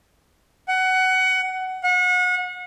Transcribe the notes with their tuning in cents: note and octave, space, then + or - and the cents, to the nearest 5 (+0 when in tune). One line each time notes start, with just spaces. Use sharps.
F#5 +20
F#5 -35